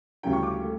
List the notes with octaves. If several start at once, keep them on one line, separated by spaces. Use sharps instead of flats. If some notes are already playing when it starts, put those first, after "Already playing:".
D2 C#3 E3 G3 C#4 G5
C#6
D6
A3